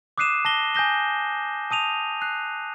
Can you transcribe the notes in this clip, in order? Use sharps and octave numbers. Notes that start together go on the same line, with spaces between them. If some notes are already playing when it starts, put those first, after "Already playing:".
D6 D#6 F#6 C7 D#7 E7
A5 A#6 G7
G#5 D#6 G6 A#6 G7
A5 D#6 D#7 F7
F#6 C7